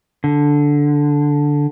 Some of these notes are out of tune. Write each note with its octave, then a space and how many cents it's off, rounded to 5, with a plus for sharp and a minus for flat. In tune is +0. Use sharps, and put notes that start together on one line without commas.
D3 -5